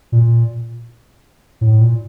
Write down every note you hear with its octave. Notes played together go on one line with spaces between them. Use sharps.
A#2
A2
A#2